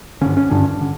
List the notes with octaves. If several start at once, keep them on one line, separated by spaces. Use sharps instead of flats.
G2 D3 C#4
C#4
G2 D3 D4
D3